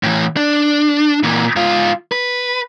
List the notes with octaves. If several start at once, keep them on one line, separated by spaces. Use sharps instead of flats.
A2 E3
D4
A#2 E3
G#2 F4
B4